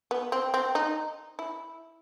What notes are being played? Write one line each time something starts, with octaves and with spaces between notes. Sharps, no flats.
B3
C4
C4
D#4
E4